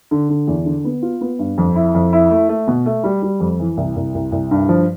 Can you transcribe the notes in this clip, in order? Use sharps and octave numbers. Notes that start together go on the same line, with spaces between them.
D3
D3
E2
D3
B3
F4
B3
G2
F2
E4
F2
E4
A3
A3
B2
A3
G3
G3
F2
E3
C2
C2
C2
C2
G2
F3